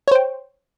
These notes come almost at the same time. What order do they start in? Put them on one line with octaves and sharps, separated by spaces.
C#5 C5 G5